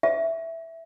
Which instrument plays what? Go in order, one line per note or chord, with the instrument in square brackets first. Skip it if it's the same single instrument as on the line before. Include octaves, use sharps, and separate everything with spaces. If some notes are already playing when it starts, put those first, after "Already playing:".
[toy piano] E5